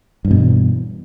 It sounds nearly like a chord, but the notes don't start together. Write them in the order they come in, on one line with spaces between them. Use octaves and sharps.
G2 E3 B2